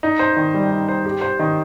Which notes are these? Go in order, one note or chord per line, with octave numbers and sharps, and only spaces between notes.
D#4
C5
D#3
G3
D#4
C5
G4
C5
D#3